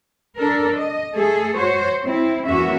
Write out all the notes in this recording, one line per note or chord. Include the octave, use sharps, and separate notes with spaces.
D4 A4 A#4
D#5
A3 G#4 A4
F#4 C5 C#5
C4 E4
E2 A#3 C#4 F#4 E5